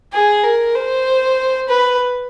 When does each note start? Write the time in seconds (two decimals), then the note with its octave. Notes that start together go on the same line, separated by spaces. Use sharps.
0.13 G#4
0.44 A#4
0.75 C5
1.69 B4